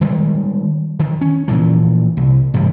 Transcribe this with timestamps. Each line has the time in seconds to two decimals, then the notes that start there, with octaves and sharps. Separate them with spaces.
0.01 D#3 G3 G#3
0.99 D#3
1.21 C#4
1.48 A#2 E3 F3
2.17 C2
2.54 A1 G2 E3 G3